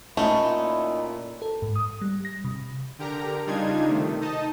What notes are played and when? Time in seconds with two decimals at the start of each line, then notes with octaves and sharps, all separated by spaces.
0.17 A#2 A3 C#4 D#4 E4
1.42 A4
1.62 G#2
1.76 D#6
2.01 G3
2.25 A#6
2.44 C3
2.99 D3 G4 A#4 A#5
3.46 C#3 G3 D4 D#4 F4 G#6
3.88 C3 D#3 A3
4.21 D#4 D#5 A5